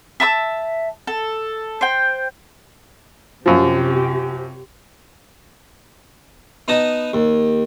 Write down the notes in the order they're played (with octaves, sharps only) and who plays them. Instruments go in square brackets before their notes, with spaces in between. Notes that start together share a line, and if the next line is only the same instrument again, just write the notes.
[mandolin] E5 A5 B5 E6
A4
C5 G5
[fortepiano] F#2 F3 [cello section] C3 G4
[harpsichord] B3 D#4 D#5 A5 D#6
D#2